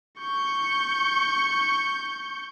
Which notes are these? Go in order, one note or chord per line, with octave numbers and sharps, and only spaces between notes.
C#6 G6